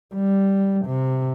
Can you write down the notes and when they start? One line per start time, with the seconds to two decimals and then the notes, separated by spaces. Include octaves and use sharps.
0.15 G3
0.86 C3